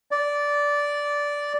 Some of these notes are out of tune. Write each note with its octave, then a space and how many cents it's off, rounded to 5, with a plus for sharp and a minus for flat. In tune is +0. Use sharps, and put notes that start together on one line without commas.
D5 -10